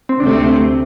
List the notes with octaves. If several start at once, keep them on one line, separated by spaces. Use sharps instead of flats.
C4
D2 C3 A3 C4 D4